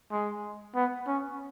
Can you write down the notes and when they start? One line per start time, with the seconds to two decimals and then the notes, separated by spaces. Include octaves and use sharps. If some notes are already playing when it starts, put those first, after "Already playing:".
0.11 G#3
0.75 B3
1.07 C#4